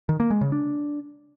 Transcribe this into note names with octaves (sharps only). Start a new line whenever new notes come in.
D#3
A#3
G#3
C#3
D4